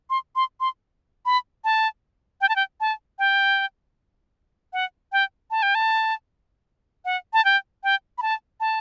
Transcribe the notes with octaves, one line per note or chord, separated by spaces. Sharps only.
C6
C6
C6
B5
A5
G5
A5
G5
A5
G5
F#5
G5
A5
G5
A5
F#5
A5
G5
G5
B5
A5
A5